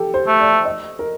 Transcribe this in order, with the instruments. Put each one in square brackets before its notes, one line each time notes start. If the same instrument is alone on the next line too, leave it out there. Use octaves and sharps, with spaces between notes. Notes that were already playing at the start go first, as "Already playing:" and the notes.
Already playing: [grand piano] G4 A4
C5
[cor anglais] A3
[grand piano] D5
D#5
A#4